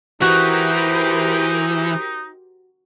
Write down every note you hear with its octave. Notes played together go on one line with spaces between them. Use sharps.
E3 D#4 F#4 G4 A#4 C5